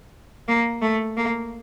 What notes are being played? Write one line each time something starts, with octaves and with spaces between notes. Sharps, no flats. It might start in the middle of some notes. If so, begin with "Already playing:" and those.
A#3
A3
A#3